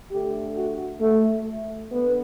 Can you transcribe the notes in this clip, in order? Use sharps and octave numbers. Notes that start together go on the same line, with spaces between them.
D3 A3 G4
F#4
A3
D3 B3